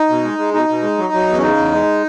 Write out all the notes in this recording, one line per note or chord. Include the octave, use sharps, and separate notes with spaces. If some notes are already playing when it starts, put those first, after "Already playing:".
Already playing: D#4
B2
G#3
G#3
B2 D#4
B2
G#3
F#3
F#3
E2
C#4
C#3 D#4
E2
G#3